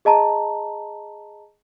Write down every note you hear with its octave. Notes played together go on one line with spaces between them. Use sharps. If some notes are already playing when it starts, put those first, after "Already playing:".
G#4 D#5 A5 A#5